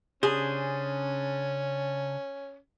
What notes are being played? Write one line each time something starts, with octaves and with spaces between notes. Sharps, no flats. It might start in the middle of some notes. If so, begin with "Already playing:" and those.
C#3 C#4 D4 G#4 C5